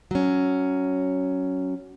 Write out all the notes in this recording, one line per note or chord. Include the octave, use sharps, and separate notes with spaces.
F#3 C#4